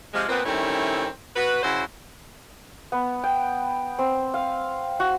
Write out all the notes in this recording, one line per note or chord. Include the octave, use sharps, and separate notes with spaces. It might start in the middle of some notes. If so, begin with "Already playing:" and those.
C3 F3 G#3
A#2 B3 C4
D#3 G3 A3 C4 C#4 E4
F#4 B4
C#3 F#3 E4 F#4 C5
B3
G5
C4
F5
F#4